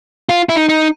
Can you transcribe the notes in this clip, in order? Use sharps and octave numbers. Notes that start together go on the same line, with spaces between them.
F4
E4
D#4
D#4